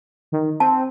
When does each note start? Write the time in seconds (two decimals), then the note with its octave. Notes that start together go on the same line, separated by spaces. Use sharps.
0.32 D#3
0.60 C4 A5